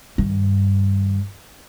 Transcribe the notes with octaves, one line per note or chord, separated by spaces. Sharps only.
G2 D#3